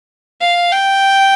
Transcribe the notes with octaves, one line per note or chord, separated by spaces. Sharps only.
F5
G5